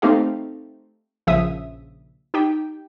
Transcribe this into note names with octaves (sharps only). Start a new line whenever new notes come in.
A3 C4 D#4 G4 F5
A#1 C#3 F3 E5 D#6
D#4 G4 G5